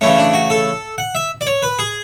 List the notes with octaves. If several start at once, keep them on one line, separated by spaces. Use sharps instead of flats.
C#3 E3 A3 C#4
D4
F#4
A4
F#5
E5
D5
C#5
B4
G#4